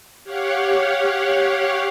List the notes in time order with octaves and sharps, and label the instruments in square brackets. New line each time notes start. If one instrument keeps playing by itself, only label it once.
[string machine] G4 C#5 F5 F#5